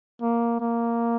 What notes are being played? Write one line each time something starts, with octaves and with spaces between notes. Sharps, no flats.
A#3
A#3